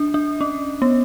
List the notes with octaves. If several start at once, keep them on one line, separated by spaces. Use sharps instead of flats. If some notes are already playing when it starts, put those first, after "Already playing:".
Already playing: D4
D4
C#4
B3